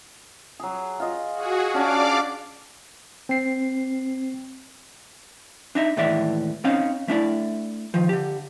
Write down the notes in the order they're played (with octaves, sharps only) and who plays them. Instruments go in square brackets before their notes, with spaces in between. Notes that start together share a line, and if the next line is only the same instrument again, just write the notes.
[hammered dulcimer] F#3 G#4
F4 D#5
[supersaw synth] F#4 G#4
[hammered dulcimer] C#4 D4 [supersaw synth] D5 F5 D6
[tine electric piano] C4 C7
[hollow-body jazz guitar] D4 D#4 E5
D#2 A2 E3 G#3 D5 E5
C4 C#4 D#4 C#5 F5
A3 D4 E4 D5
D#3 F3
D3 G4